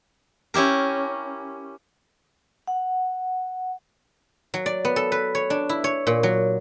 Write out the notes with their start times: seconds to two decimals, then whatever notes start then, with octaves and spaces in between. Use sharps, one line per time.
0.54 C#4 E4 G4 A#4
2.68 F#5
4.54 F#3
4.66 D5
4.85 B3
4.96 A4
5.12 B4
5.35 C#5
5.50 D4
5.69 E4
5.84 C#5
6.07 A#2
6.23 F#3